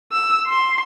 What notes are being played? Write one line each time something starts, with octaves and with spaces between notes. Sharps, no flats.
E6
C6